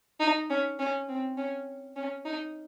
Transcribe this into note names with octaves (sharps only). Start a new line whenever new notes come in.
D#4
C#4
C#4
C4
C#4
C#4
D#4